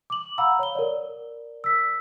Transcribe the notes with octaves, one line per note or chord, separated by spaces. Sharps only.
D6 F#7
F5 F#5 A#5 B5 E6
C#5 G7
A#4 D5
E6 B6